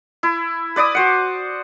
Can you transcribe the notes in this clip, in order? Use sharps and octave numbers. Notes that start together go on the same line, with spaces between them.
E4
B4 D5 D6 D#6
F#4 C5 F#5